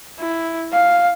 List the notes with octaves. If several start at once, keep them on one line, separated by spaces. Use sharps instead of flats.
E4
F5